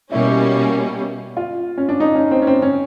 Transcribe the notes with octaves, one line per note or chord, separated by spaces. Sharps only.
B2 G3 A#3 C#4 E4
F4
C#4
D4
D#4
C#4
C4
C#4
C4
C#4